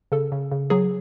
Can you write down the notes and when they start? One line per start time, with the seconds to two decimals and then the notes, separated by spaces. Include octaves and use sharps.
0.12 C#3 A4
0.32 C#3
0.52 C#3
0.70 F#3 G#4